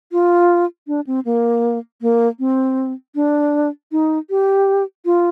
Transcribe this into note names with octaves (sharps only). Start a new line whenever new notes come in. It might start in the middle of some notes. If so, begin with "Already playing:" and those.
F4
D4
C4
A#3
A#3
C4
D4
D#4
G4
F4